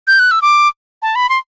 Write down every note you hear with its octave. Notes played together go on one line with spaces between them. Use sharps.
G6
F#6
E6
D6
A5
B5
C6